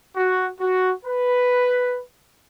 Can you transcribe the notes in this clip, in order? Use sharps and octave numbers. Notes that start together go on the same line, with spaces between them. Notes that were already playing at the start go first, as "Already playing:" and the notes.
F#4
F#4
B4